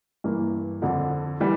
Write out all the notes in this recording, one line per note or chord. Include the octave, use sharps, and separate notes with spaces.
G2 E3 A#3
F2 D3 F3
E3 G3